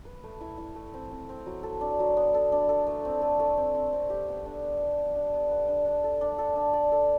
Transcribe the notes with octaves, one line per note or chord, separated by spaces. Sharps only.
B4
A3
E4
E4
A3
C4
C4
C4
F#3
A4
D4
F#3
B3
A4
D4
A4
A3
C4
A3
A3
C4
C4
C4
G4
B3
D4
B3
B3
B3
D4
B3
B3
D4
D4
A4
D4
A4
D4
D5
A4